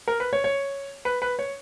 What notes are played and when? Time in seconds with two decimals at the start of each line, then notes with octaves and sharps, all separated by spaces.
0.08 A#4
0.20 B4
0.33 C#5
0.44 C#5
1.05 B4
1.22 B4
1.39 C#5